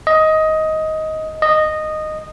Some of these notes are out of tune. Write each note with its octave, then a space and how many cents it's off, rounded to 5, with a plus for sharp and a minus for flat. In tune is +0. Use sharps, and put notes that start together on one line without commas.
D#5 +15
D#5 -10